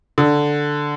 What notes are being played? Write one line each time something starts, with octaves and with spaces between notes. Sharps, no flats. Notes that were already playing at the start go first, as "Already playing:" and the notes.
D3